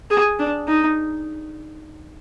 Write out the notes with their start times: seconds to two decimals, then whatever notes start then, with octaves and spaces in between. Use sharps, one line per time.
0.10 G#4
0.39 D4
0.68 D#4